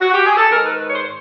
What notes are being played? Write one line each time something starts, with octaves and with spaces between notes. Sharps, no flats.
F#4
G4
G#4
A4
G#2 D#3 G#3 A#4
B4
B4
C#5
C5